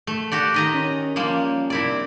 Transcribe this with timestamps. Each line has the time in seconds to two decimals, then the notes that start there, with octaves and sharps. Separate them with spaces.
0.07 A3
0.32 F#4 G4 D5 A6
0.54 D#3 D#5 A#5 B6
0.74 C#4
1.16 F3 G3 A#3
1.70 C3 D4 E4 D5